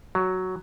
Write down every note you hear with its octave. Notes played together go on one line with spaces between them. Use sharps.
F#3